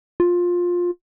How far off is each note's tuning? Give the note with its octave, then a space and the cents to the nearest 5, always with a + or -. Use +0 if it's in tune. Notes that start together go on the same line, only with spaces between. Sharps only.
F4 +15